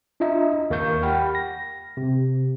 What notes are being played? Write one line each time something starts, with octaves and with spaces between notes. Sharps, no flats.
D4 E4 F4 D#5 E5 A#5
D#2 A#4 F5 C#6 G6
G4 F#5 G5 B5 F6
A#6
C3